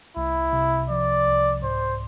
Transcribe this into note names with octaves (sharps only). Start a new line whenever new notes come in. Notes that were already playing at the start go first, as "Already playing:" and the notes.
C2 E4
C3
F3 D5
C2
G#2 C5